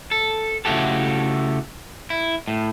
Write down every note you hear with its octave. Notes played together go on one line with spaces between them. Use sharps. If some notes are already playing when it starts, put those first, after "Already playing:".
A4
C#3 A3 E4 F#4 G4 A4
E4
A2